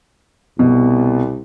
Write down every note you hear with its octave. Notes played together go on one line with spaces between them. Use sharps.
C2 B2